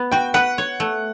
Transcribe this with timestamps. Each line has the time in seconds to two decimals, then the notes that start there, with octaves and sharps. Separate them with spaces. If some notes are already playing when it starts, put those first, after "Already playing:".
Already playing: B3
0.12 F#4 G5
0.34 B4 F#5
0.58 C#5
0.80 A3